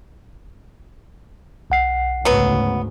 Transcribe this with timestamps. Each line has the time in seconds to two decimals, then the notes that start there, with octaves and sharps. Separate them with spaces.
1.70 B1 F#5 C7
2.25 D2 G#2 C#3 F#3 B3